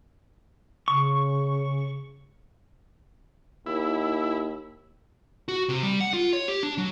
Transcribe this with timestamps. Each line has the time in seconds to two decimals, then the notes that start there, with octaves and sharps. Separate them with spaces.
0.88 C#3 C#6
3.66 D#2 E4
5.48 F#4
5.69 C3
5.83 G3
6.00 F#5
6.13 F4
6.33 C#5
6.48 G4
6.63 D4
6.78 F#3